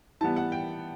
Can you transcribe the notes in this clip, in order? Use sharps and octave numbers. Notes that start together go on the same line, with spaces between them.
E3 G3 B3 A5
F#5
G5